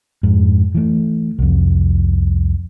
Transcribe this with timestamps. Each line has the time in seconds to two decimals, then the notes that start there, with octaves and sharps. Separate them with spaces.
0.23 F2 G#2
0.75 E3 A3
1.39 C2 F2